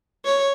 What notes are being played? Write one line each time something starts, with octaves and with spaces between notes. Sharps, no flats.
C#5